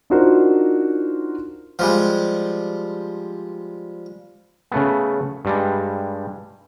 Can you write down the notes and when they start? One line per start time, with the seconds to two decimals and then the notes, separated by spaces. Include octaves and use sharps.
0.10 D4 D#4 F4 F#4 A#4 C5
1.79 F3 G3 G#3
4.72 C#3 A3 B3
5.45 G2 G3 G#3